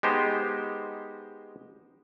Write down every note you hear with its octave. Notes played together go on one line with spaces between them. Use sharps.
G#3 B3 D#4 G4 C5